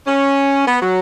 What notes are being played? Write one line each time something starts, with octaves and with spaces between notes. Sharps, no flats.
C#4
B3
F#3